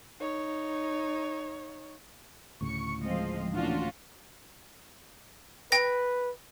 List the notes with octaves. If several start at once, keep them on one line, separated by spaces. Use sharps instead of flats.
D#4 C#5
D2 A2 C#3 C#6 C#7
F3 G#3 C4 D#5 F5
A#2 E3 A3 A#3 C#4 D4 F4 F#4
B4 G5 A#6